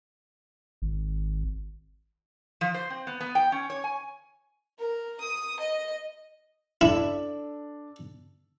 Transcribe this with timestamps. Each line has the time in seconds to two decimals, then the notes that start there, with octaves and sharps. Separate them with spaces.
0.82 G#1
2.61 F3
2.74 C5
2.90 C4
3.07 B3
3.20 B3
3.35 G5
3.52 C#4
3.70 C#5
3.84 G#5
4.78 A#4
5.20 D#6
5.59 D#5
6.81 D4 E4 A4